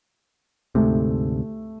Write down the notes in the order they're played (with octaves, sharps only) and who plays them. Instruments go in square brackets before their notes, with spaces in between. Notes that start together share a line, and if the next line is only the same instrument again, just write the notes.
[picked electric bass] D2 G#2 C3 [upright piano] A3